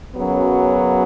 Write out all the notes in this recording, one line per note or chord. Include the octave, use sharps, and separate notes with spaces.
F#2 C#3 F#3 B3